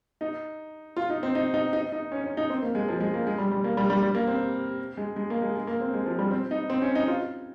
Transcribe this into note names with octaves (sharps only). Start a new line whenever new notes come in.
D#4
F4
D#4
C4
D#4
D#4
D#4
D#4
C#4
C#4
D#4
C4
A#3
G#3
F3
G#3
A#3
G#3
G3
G3
A#3
G3
G3
G3
A#3
C4
G#3
G#3
A#3
G#3
G#3
A#3
C4
G#3
F3
G3
C4
D#4
C4
C#4
D#4
F4